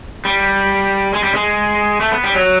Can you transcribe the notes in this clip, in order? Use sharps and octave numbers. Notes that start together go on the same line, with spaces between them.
G3
G#3
G3
G#3
A3
B3
G3
F#3